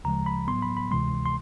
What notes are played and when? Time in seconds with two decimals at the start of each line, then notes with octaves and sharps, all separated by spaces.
0.04 D2 C#3 F3 G#3 A#5
0.26 B5
0.48 A2 F#3 B3 C6
0.62 B5
0.77 B5
0.91 D2 C3 E3 G#3 C6
1.26 C6